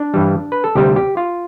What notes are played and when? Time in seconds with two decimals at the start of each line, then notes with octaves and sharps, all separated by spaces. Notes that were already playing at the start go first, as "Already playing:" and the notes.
Already playing: D4
0.14 G2 E3 G3
0.52 B4
0.64 A4
0.75 D2 C3 G3 G4
0.96 G4
1.17 F4